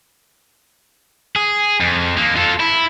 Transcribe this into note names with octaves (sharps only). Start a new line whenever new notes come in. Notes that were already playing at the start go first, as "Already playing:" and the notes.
G#4
F2
D#3 A#3
F4 A4
E4